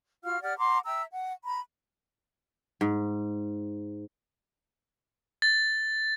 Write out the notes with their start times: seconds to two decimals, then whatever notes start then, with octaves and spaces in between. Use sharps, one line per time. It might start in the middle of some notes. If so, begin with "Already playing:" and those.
0.23 F4 F#4 F5 F6
0.42 G4 D5 F#5 F6
0.57 F#5 A#5 C6 D6
0.85 E5 G5 A#5 E6
1.12 F#5
1.43 A#5 B5
2.81 G#2
5.42 A6